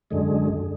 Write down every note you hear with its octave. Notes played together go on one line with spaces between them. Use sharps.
F#2 D3 G#3